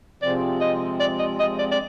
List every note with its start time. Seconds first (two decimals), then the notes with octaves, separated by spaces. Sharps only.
0.22 C3 F3 G#3 C4 D5
0.61 D#5
1.00 D5
1.19 D#5
1.40 D#5
1.59 D5
1.71 D5